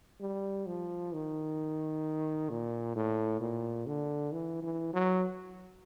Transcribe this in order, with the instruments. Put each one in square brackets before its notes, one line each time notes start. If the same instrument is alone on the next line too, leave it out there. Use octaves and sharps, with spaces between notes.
[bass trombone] G3
F3
D#3
A#2
A2
A#2
D3
E3
E3
F#3